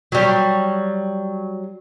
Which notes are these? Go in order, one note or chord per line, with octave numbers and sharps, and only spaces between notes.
F#3 G3